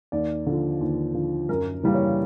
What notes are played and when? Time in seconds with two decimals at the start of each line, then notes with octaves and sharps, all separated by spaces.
0.12 D#2 D5
0.47 D3 F3
0.81 D#2
1.14 D3 F3
1.49 F#2 A#4
1.83 C#3 E3 G3 A#3
1.94 C#5